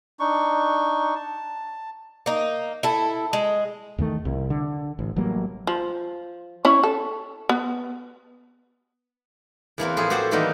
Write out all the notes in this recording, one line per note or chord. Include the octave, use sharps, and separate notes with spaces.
D4 D#4 C#6
A5
A#3 D#4
E4 A4
G#3
E2 D#3 A3
C2
D3
A1
A1 F#3 G3 A#3
F3
C#4 E4 C#5
A4
B3
E2 E3 A#3 C4
A2 F3 E4 F4 G#4
F#4 G4 A4 C5 F#5
D#3 E3 G3 A#3 B3 D#4